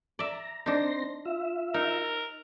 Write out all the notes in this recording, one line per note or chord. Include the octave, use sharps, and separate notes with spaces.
D5 E5 A#5
C4 D4 D#4 C6 A#6
F4 E5
D#4 A#4